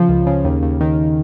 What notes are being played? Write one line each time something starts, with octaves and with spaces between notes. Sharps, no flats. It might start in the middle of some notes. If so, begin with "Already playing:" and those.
Already playing: C#3 F3
C#2
C#3
D#2
D#2
D#3